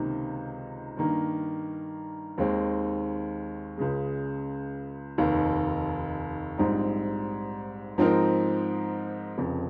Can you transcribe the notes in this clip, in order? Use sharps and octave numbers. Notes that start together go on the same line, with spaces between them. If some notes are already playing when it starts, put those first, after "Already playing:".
Already playing: C#2 C3 D#3 A#3 D#4
G2 D#3 A#3
D#2 D#3 G#3 C4
C#2 C#3 G#3
F1 D#2 D#3
A#1 G#2 G3 C4 D#4
G#2 F3 C4 D#4 A#4
F1 F2 C#3